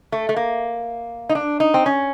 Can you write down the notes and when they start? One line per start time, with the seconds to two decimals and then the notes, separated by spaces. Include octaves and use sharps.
0.12 A3
0.29 A3
0.36 A#3
1.29 D#4
1.35 D4
1.60 D#4
1.74 C4
1.86 C#4